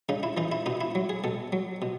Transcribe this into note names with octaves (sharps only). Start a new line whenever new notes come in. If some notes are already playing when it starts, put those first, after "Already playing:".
C#3 D#4
E4
E3 D#4
E4
B2 D#4
E4
F#3
G#4
B2 A4
F#3
B2